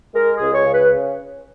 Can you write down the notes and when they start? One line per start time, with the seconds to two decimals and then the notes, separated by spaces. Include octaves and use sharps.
0.15 G#3 A#4
0.35 G#4
0.42 C#2
0.54 C#5
0.66 C#3
0.74 B4